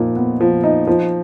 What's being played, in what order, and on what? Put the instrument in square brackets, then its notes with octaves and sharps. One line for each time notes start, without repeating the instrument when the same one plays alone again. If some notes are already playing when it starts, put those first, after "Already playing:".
Already playing: [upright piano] A#2 F3 D#4
B3
F3
D#4
F3